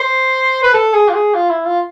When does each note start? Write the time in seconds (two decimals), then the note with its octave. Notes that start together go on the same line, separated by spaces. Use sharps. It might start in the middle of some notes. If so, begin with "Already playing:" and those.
Already playing: C5
0.63 B4
0.74 A4
0.94 G#4
1.08 F4
1.14 G#4
1.34 F4
1.50 E4
1.65 F4